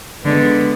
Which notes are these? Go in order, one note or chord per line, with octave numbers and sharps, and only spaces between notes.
D3 G#3 B3